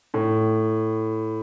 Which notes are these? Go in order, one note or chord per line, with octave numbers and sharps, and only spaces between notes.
A2